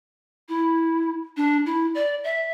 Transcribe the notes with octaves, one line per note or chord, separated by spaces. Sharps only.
E4
D4
E4
D5
E5